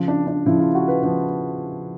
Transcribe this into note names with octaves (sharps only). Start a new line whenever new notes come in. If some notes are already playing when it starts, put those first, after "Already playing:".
Already playing: C#3 F3
D4
D4
C#3 F3 E4
F4
F#4
B4
C#3 F3 B4